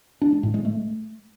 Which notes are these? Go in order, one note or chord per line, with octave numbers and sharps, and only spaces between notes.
D4
G#3
A2
G#3
A3